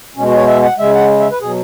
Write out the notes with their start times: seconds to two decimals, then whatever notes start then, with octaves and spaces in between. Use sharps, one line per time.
0.16 B2 G#3 C#4
0.26 F#4
0.37 C#5
0.47 E5
0.63 F#5
0.78 C#3 G#3 E5
0.95 F#5
1.20 E5
1.31 B4
1.41 B2 F#3 G#4